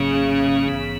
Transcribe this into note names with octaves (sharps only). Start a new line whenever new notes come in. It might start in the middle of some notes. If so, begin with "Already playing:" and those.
Already playing: G#1 G#2 C#3 F#3 A#3 C#4
A#1 G#2 E3 B3